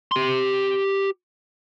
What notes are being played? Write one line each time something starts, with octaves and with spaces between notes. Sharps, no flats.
G4 C6